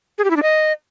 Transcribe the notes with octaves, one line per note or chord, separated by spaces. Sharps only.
G#4
G4
E4
D4
D#5